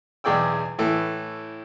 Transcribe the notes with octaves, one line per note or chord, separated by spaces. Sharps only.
B1 E2 G#4 D5 G5 E6
A2 E3 A3